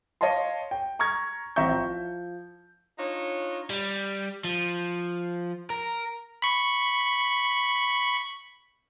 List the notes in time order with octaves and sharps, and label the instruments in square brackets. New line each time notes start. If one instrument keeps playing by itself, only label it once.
[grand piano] C#5 D#5 F5 A5 C6
G5
A#5 C#6 F6 G#6
A1 C4 E5 A#5 C#6 G6
F3
[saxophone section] D4 D#4 F4 C#5
[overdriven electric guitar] G3
F3
A#4
[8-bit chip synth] B5 C#6